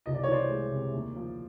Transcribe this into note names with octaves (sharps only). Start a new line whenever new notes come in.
C2 D#5
D5
C#5
E3 C5 D5
G#3
C3
D#2
F3